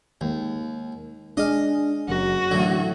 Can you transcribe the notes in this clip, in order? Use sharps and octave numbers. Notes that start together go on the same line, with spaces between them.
D#2 D#3 G#3
G#3 D4 G#4 D#5 F5
F#1 F#3 C#4 F#4 A#4
A2 D3 E3 F#3 D4